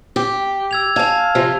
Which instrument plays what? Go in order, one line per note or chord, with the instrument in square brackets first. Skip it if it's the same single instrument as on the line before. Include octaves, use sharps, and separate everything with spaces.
[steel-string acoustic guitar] G4
[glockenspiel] E6 G#6 F7
[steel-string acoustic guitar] F5 G#5 [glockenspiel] A5 G#6
[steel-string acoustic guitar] C3 F3 F4